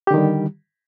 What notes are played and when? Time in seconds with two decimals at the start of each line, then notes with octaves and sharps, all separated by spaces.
0.07 G4
0.11 D3
0.14 D#3
0.17 G3